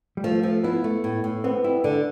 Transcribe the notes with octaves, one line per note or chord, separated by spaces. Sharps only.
G3
F3 A3
F3 A3
B3 E4
A3
A2
A2
B3 C4
G3 E4
D3 D4